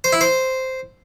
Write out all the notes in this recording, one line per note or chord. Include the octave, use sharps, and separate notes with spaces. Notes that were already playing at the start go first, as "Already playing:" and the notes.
C5
E4
C5